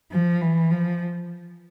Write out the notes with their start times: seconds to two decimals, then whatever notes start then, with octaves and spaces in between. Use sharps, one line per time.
0.12 F3
0.41 E3
0.71 F3